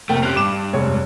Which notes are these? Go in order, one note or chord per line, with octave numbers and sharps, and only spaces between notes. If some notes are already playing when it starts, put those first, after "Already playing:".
F1 A3 A#3 G5
C4 C#4 G4 F#6 F7
G2 D6 E7
F1 G#3 C#5